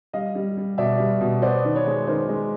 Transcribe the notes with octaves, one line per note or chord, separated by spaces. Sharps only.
G3 D#5 F5
G3
G3
B2 D5 E5
G3
B2
B3 C5 D5
D#3
B4 C#5
G#3
D#3 A#4 C5
G#3